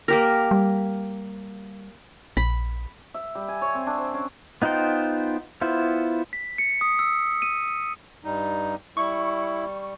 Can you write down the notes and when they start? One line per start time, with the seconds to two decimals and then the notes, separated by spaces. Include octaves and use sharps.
0.08 A#3 G4 A#4
0.51 G3
2.37 A#1 B5
3.14 E5
3.35 G3
3.48 G#5
3.62 C#5
3.75 C4
3.87 D4
3.98 C5
4.14 C#4
4.62 B3 D#4 F4 C5 G5
5.61 B3 E4 F4 C5
6.33 B6
6.58 C#7
6.81 D#6
6.99 E6
7.42 D#7
8.25 G2 G3 D#4
8.97 G3 E4 C#6